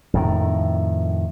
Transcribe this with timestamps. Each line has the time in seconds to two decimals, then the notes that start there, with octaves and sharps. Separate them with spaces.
0.14 F2 A2 D#3